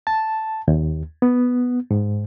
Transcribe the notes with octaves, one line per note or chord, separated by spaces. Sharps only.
A5
D#2
B3
G#2